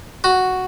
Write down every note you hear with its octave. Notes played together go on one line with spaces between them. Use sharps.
F#4